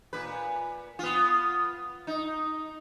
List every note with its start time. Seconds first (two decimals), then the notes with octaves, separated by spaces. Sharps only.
0.13 A#2 B4
0.99 B3 F4
2.07 D#4